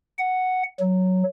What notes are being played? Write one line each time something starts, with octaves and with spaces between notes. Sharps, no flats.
F#5
F#3